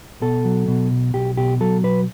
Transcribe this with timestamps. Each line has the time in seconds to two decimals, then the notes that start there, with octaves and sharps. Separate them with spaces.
0.22 B2 A4
0.45 F#3
0.68 B2
0.91 B1
1.14 B1 G4
1.37 B2 G4
1.60 F#3 A4
1.83 B1 B4